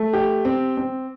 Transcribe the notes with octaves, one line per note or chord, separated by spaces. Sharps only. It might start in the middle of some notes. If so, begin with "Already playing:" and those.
Already playing: A3
G4
C4
C4